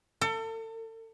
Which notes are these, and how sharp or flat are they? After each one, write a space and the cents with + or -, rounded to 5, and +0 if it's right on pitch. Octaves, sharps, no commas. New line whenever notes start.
A4 +35